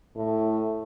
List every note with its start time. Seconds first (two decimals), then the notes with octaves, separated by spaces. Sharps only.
0.16 A2